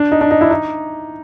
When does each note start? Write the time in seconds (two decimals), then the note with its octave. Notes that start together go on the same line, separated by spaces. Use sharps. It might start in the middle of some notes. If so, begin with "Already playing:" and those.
Already playing: D4
0.12 D#4
0.21 D4
0.31 D#4
0.41 E4
0.51 D#4